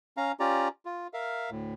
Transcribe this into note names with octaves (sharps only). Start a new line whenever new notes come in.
C#4 F5 A#5
C#4 F4 G4 D5 A#5
F4
A#4 E5 F5
D2 A2